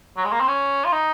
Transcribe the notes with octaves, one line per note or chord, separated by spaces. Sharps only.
F#3
G#3
A#3
C4
C#4
F4
D#4